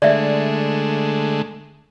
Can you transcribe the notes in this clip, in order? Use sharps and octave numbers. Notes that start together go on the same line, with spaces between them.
D3 G#3 A3 D5 E5